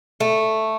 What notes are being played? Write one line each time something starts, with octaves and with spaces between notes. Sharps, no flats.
A3